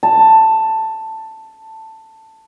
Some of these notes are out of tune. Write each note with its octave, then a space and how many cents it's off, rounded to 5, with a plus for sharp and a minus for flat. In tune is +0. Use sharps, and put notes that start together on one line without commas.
A5 +10